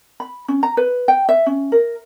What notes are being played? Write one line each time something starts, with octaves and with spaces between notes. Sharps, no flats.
B5
C#4
A#5
B4
G5
E5
C#4
A#4